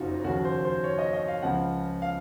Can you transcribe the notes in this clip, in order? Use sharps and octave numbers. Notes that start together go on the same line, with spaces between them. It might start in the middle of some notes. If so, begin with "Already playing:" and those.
Already playing: F#1 F2 C#3 D#4 F4 F#4
D#2 C#3 F3 F#4
C5
C5
C#5
D#5
D#5
F5
C#2 C#3 F3 F#5
F5